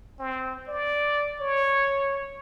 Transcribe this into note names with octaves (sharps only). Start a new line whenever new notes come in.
C4
D5
C#5